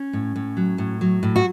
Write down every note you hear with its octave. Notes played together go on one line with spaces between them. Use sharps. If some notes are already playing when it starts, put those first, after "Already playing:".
Already playing: C#4
A2
A2
F#3
A2
F#3
A2
F#4